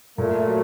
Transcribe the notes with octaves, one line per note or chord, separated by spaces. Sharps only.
A#2 A3
F#3